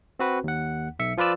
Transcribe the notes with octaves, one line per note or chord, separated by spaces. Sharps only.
C4 F#4 B4
D#2 F#5
B1 E5 C#7
F3 F4 B4 D5 E6